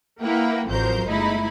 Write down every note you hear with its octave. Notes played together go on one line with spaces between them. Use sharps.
A#3 E4 B4 F#5 G5
A1 F2 F#3 A#4 C5 G6
G1 C#2 A3 D#4 E4 B5